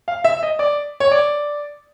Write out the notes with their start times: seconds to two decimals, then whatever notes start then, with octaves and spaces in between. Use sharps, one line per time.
0.08 F5
0.24 E5
0.43 D#5
0.59 D5
1.00 C#5
1.11 D5